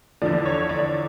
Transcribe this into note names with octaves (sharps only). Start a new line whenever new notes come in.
E2 D3 F3 D5
C#5
D5